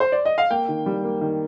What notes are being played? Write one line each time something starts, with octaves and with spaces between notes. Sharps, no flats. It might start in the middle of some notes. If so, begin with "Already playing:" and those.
C5
D5
D#5
F5
A#3 G5
D#3
G3
A#3
D#3